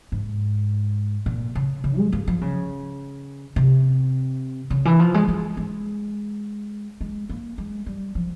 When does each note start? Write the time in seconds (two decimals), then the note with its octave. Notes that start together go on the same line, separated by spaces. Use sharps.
0.12 G#2
1.26 A#2
1.55 C#3
1.84 C#3
1.98 G#3
2.12 A#3
2.28 F3
2.41 C#3
3.56 C3
4.70 C#3
4.85 E3
4.99 F3
5.14 G#3
5.28 G#3
5.57 G#3
7.01 G#3
7.29 A#3
7.58 G#3
7.86 G3
8.15 F3